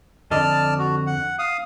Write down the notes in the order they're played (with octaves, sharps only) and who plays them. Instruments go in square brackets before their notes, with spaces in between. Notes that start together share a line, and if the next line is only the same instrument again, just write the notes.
[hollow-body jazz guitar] F2 D3 D#5 [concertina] D5 A5 F6
[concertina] F#4
F#5
F5 D#6